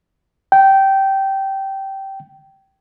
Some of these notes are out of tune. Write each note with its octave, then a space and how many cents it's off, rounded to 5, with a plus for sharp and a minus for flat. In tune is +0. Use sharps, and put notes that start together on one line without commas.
G5 -15